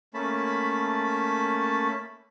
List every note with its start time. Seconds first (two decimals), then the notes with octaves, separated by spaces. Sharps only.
0.14 A3 A#3 C#4 A5 B5